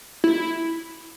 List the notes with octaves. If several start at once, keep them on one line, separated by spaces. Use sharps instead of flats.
E4